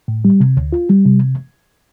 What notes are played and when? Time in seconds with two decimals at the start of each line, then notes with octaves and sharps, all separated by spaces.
0.08 A2
0.25 G3
0.40 C3
0.57 D2
0.73 F4
0.90 G3
1.05 C3